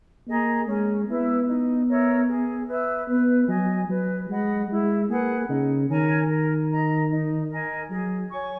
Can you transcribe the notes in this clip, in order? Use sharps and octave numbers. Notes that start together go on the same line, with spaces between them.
A#3 G#4 D#5 A#5
G#3 C#4
B3 E4 B4 E5
D#4
A#4 C#5 E5
G#4
B4 E5
B3 B4
F#3 D#5 G#5
F#3 B4
G#3 D#5 F#5 B5
G#3 E4
A#3 G#4 B4 F#5
C#3 D#4
D#3 A#4 C#5 G#5
A#4
D#5 A#5
D#4
A#4 D#5 G#5
F#3 G#4
C#5 G#5 C#6